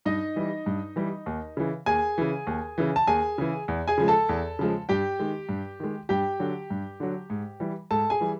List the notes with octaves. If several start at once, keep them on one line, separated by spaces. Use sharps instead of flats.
G2 D#4 D#5
E3 G3
G2
E3 G3
D#2
C#3 E3
D#2 G#4 G#5
C#3 E3
D#2
C#3 E3
A5
D#2 G#4 G#5
C#3 E3
E2
G#4 G#5
C#3 F3 G#3
A4 A5
E2
C#3 F3 G#3
G2 G4 G5
D#3 G#3
G2
D#3 G#3
G2 G4 G5
D3 F#3
G2
D3 F#3
G#2
E3 G3
G#2 A4 A5
G#4 G#5
E3 G3